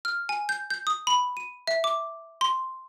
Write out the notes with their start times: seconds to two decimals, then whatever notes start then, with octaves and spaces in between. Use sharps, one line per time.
0.05 F6
0.29 G#5
0.49 G6
0.70 G6
0.87 D#6
1.07 B5
1.37 D#7
1.67 E5
1.84 D6
2.41 C6